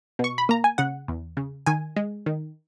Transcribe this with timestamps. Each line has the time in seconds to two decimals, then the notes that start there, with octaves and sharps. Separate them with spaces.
0.19 B2
0.24 C#6
0.38 B5
0.49 A#3 A#5
0.64 G#5
0.78 C#3 F#5
1.08 E2
1.37 C#3
1.66 D#3 G#5
1.96 G#3
2.26 D#3